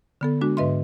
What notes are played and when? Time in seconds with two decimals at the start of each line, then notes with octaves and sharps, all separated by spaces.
0.21 D3 B3 A4
0.41 G#3 D4 F#4
0.57 G#2 D3 B4 D#5 E5 C6